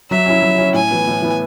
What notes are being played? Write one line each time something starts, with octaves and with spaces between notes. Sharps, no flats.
F#3 E5
C#4 E4
F#3
C#4 E4
A2 G#5
E3 B3
A2
E3 B3